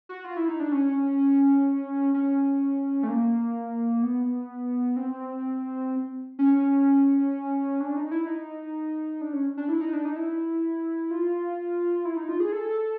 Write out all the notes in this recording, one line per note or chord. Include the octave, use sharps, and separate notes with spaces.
F#4
F4
E4
D#4
D4
C#4
C#4
A3
A#3
B3
C4
C#4
D4
D#4
E4
D#4
D4
C#4
D4
E4
D#4
D4
D#4
E4
F4
E4
D#4
F4
G#4
A4